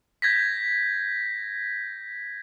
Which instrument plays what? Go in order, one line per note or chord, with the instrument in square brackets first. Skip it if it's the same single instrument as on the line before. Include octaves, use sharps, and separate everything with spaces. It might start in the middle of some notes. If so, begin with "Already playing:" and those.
[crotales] G6 G#6 A#6 B6